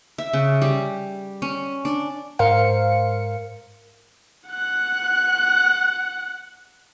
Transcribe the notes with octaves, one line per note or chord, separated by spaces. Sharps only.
E5
C#3
G3
C#4
D4
G#2 A#4 C5 F5 C#7
F#5 F#6